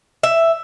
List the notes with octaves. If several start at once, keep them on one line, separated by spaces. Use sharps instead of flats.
E5